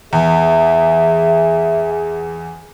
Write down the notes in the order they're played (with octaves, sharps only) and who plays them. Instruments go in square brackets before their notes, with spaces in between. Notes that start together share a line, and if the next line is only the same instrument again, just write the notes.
[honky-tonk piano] E2 [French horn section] G#4 [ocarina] E5